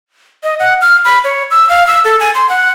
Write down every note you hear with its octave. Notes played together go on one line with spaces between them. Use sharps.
D#5
F#5
F6
B5
C#5
E6
F5
E6
A4
G#5
C6
F#5